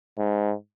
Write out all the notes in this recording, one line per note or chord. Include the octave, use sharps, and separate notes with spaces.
G#2